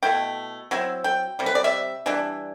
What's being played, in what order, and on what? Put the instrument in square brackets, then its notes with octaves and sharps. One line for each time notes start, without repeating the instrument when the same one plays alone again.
[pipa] B2 A3 E4 G5
F#3 C4 E4
G5
C3 G3
B4
D5
E5
E3 G3 D4